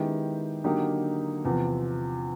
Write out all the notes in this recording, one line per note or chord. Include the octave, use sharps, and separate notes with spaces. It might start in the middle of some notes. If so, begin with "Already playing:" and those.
Already playing: D#3 G#3 B3 E4 G4
D3 F#3 A#3 D#4 G4
E2 C3 F3